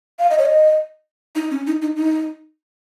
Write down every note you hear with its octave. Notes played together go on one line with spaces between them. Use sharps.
F5
D#5
C#5
D#5
D#4
C#4
D#4
D#4
D#4